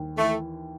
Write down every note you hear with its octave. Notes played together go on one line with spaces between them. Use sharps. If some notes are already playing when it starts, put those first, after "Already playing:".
Already playing: D#2
E3 A3